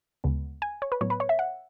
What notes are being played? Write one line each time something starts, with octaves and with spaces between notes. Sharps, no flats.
D2 C#3 G#3 B3
G#5
C#5
B4
A2 F#3 B3 C#5
B4
C#5
E5
F#5